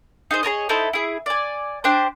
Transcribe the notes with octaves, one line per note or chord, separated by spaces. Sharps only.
D#4 G#4 C5
G#4 A#4 C#5 D#5
D#4 E4 A4 C5
E4 G#4
D5 G#5
D4 G4 C5